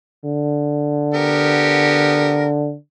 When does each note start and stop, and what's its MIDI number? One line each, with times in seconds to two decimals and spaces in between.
0.24 2.75 50
1.14 2.53 59
1.14 2.53 67
1.14 2.53 70